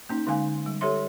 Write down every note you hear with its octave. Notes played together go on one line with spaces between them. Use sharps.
A#3 C#4 D#4
D3 G#3 D#4 F5 G#5
G3
G4 A4 C#5 E5 C6